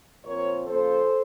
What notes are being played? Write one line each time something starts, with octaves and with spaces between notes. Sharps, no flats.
A#2 F3 C4 A#4 C#5
C#3 F3 A#3 C#4 A4 C5